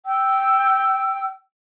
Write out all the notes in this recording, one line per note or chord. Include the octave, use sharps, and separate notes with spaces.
G5 E6